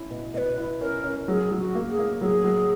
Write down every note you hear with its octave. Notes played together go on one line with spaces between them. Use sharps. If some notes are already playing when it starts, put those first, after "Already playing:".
Already playing: C#4 E4
B2
B2 B4 D#5
E4
C#4 A#4
C#4
F#3 G#4
F#3
F#4
A#3
G#4
A#3
F#3 G#4
F#3